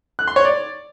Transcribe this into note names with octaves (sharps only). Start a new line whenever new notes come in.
F#6
C6
C#5
D5